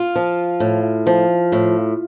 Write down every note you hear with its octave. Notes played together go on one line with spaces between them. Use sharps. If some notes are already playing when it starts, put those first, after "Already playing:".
Already playing: F4
F3
A2
F3
A2